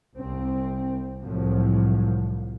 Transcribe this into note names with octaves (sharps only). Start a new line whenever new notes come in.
C2 C4
C2 A2 F3 F#3